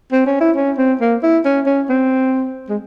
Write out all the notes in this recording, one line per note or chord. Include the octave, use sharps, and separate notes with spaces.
C4
C#4
E4
C#4
C4
A#3
E4
C#4
C#4
C4
G#3